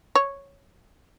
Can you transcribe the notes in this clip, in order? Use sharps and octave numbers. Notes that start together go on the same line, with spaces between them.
C#5